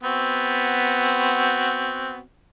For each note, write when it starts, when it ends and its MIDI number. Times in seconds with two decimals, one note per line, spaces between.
0.03 2.20 59
0.03 2.20 60
0.03 2.20 66